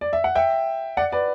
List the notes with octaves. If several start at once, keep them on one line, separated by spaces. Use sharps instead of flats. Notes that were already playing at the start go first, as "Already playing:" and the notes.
D5
E5
F#5
E5 G5
D5 F#5
B4 D5